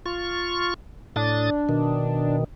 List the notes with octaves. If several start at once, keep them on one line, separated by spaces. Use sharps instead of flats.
F4 C#6
A2 D4 D#6 A6
B2 D#3